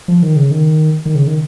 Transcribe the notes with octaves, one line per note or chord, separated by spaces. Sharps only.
F3
D#3
C#3
D#3
D#3
C#3
D#3